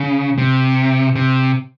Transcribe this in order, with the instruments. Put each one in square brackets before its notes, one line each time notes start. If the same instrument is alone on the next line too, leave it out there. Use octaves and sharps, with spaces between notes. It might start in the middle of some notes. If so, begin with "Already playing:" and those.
Already playing: [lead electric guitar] C#3
C3
C3